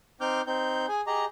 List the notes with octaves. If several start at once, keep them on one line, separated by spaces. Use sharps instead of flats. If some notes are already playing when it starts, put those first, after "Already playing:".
C4 D#4 D6 F6 G6
C4 D#4 G6
G#4 G#5
G4 G#4 D#5 A#5